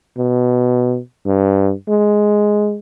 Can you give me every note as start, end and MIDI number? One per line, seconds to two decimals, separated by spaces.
0.18 0.99 47
1.26 1.72 43
1.88 2.79 56